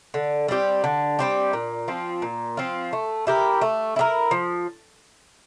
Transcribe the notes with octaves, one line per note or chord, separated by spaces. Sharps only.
D3
G3 C4 G4
D3
G3 C4 G4
A#2
F3 C4 F4
A#2
F3 C4 F4
A3
E4 G4 A#4
A3
E4 G4 A#4
F3